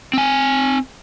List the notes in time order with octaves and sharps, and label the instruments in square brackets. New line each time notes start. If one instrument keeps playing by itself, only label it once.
[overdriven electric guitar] C4 G#5